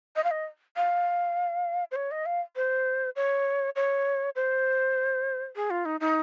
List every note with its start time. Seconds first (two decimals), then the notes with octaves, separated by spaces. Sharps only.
0.16 D#5
0.24 F5
0.31 D#5
0.76 F5
1.91 C5
1.96 C#5
2.11 D#5
2.26 F5
2.56 C5
3.16 C#5
3.76 C#5
4.36 C5
5.56 G#4
5.70 F4
5.85 D#4
6.00 D#4